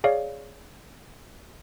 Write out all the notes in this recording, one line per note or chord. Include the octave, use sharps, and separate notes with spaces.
G#4 C#5 D5 F5